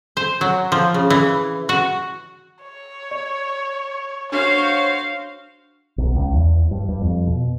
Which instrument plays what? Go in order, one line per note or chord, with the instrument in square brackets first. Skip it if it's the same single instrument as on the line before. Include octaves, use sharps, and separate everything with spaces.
[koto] C5
F#3
F3
C#3
E3
F#4
[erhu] C#5
[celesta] D5
[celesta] D4 [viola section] F#4 C5 F5 [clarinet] C#5 [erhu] C#6
[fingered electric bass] B1
C#2
E2
G2
G2
F2
B2